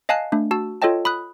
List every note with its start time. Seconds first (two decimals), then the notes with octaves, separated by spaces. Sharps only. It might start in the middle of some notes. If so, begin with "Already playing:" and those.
0.09 D#5 F5 G#5 A5 F#6 C7
0.32 A3 D4
0.51 F#4 A5 E6
0.82 F4 A4 C#5 D#5 G5 A5
1.05 B5 D#6 F#6